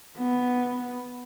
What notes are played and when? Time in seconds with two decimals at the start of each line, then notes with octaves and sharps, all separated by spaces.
0.18 B3